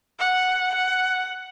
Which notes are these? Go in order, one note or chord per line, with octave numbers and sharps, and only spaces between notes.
F#5
F#5